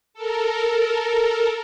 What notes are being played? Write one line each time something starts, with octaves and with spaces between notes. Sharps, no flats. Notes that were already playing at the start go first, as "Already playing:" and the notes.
A4 A#4